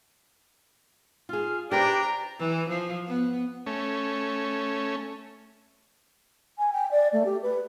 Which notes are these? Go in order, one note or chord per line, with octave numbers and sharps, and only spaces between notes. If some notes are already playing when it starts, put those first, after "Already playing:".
F4 G#4 F6
D4 G4 B4 C5 G5 A#5 A#6
E3
F3
B3
A3 C#4
G#5
G5
D5
A3
G4
B4